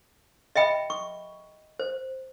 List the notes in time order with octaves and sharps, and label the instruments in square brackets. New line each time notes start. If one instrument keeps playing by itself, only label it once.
[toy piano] D#5 E5 G5 B5
C#6
C5